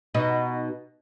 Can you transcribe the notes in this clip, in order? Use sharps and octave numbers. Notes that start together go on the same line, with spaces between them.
B2 D#4